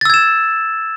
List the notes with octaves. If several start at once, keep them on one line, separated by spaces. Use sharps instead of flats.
E6 G#6 A6 E7